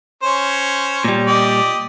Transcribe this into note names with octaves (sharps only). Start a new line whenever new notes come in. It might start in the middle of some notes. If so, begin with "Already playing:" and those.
C#4 C5 C#5
A#2 G3
G4 D5 D#5